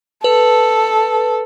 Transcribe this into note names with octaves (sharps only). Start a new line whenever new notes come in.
A4 B4